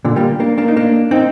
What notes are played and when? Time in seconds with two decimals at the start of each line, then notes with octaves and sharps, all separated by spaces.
0.04 A#2 D3
0.16 G3 A#3
0.40 A#3 D4
0.58 A#3 D4
0.68 D#4
0.77 A#3 D4
1.11 C4 D#4